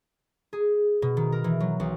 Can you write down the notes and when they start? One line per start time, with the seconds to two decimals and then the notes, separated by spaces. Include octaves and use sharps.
0.53 G#4
1.02 B2
1.17 D#3
1.32 A#4
1.44 E3
1.60 F#3
1.80 B1